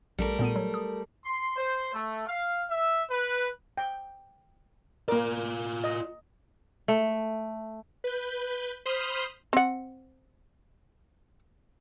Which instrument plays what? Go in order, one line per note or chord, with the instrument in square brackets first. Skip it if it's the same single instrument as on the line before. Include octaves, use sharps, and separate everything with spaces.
[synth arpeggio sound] A#1 [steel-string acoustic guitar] G3 A3 A#4
[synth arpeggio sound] A#2 B3 D#7
F#3
D#6
[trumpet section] C6
C5
A3
F5
E5
B4
[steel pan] G5
[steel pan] A#3 A#4 [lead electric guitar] F4 D5
[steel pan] D#5
[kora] A3
[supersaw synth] B4 G6
C5 B5 C6 D#6 F6
[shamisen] C4 F#5